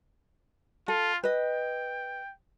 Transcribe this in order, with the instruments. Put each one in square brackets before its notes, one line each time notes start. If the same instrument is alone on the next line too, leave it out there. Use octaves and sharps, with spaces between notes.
[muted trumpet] F4 [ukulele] A4
[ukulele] B4 D#5 [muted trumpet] G5